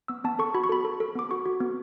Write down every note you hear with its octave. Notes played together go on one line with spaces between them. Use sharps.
B3 E6
B3 A5
A4 C#6
F#4 B5
C#6
A4 B5
A4
A4
B3 D6
F#4 C#6
F#4
B3